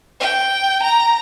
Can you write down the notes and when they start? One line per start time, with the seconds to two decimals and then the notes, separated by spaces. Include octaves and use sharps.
0.20 G5
0.83 A#5